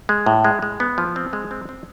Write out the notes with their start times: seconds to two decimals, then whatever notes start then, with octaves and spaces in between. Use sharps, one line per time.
0.09 G#3
0.26 A2
0.44 G#3
0.62 G#3
0.80 B3
0.98 F3
1.16 C4
1.33 G#3
1.51 C4
1.69 C4